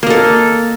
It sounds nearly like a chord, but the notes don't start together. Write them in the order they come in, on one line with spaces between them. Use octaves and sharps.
A#3 D#5 A4